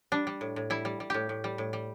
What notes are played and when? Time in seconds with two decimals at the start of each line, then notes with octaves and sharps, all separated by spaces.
0.12 G3 D4
0.27 G3
0.41 A2
0.56 A2
0.70 G3 E4
0.85 G3
1.00 G3
1.10 A2 G4
1.29 A2
1.44 G3
1.58 A2
1.73 G3